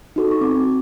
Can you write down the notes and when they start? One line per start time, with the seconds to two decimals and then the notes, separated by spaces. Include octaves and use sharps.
0.16 D#4 F#4 A4
0.31 C#6
0.41 C4 D6